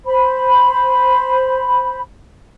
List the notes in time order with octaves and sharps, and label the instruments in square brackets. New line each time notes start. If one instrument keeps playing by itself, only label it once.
[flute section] C5 B5